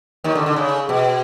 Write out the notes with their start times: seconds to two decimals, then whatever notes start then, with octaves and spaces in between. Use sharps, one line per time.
0.24 D#2 D#3
0.35 D3
0.46 D3
0.56 C#3
0.89 B2